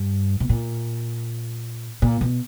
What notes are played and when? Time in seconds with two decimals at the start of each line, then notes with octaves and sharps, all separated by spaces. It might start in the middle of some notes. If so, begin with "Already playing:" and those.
Already playing: G2
0.40 B2
0.49 A#2
2.02 A#2
2.21 B2